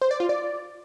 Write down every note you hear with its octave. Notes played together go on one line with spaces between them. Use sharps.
C5
D5
F4
D5